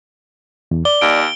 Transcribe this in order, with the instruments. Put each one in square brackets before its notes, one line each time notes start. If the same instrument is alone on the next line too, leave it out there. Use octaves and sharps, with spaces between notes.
[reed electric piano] E2
[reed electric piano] D5 [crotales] G7
[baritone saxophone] D#2 [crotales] D7